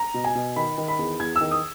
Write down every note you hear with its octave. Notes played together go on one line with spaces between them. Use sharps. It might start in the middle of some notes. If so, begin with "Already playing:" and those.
Already playing: A#5
B2
G#5
B2
D#3 B5
D#3
B5
E2
E2 G#6
E6
D#3
D#6